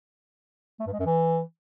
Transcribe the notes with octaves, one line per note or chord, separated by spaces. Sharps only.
A3
G2
G#3
F#2
E3